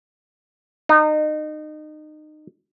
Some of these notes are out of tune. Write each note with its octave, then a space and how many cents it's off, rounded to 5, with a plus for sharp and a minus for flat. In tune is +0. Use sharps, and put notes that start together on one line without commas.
D#4 -25